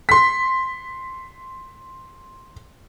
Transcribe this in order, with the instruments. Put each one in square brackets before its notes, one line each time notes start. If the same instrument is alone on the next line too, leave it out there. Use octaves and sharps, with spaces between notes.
[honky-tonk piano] C6 B6